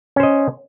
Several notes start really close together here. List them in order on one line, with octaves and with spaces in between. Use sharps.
C#4 C5 D#5